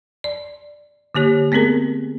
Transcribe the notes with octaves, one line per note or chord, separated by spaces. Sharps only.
D5
D3 A#3 G4 C#5
A3 B3 C4 G#4 A#4